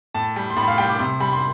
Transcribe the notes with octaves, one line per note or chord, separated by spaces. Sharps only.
A2 A5
G3
C6
A2 B5
F5
G3 G5
D6
C3 C6
G3 B5
C6